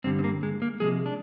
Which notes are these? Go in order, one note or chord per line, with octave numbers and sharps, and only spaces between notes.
G2 D3 G3 C4
C4
A#3
G#3
A#3
C3 F3 G#3 G#4
D4